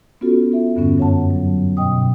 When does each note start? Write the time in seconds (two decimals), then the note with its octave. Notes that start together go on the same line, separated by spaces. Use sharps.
0.21 B3 C#4 F4 F#4 A4
0.51 B3 F4 A4 E5
0.75 E2 G2 D3 G3 B3 C#4
0.98 F#2 C#5 F#5 A5
1.30 F#3
1.77 B2 D#5 G5 D#6